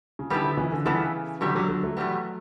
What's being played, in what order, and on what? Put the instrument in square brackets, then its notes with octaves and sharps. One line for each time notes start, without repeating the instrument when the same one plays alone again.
[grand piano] C#3
[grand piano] D3 [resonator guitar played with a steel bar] G3 B3 E4 A4
[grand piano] D3
C#3 E3
D3
[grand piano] C#3 E3 [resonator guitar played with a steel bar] G3 B3 E4 A4
[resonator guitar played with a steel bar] E2 B2 G3 B3 [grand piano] D3 F#3
[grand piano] D3 F#3
D3 F#3
F#3 A3
[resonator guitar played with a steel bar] E2 B2 G3 B3